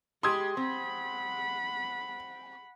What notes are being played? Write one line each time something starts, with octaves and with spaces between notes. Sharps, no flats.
G#3 G4 B5 C6 D#6 G#6
C4 F#5 B5